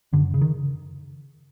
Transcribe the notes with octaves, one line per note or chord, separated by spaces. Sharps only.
F#2 D3
C#3
D#3